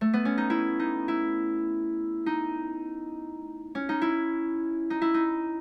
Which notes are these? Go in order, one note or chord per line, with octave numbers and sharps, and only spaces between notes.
A3
B3
C#4
D#4
E4
D#4
E4
D#4
C#4
D#4
E4
D#4
E4
D#4